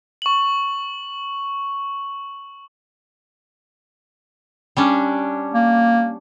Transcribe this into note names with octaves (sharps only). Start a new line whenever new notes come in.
C#6 F#7
G3 C#4 D4
A#3